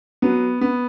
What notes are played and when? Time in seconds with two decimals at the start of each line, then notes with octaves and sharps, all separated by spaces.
0.22 F#3 B3
0.61 B3